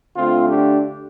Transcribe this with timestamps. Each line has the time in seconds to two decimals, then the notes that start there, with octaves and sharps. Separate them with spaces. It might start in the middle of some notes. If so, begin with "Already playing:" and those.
0.15 D3 A3 C4 F4
0.48 D4 G4